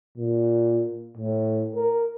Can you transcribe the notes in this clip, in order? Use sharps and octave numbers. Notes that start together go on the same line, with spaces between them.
A#2
A2
A#4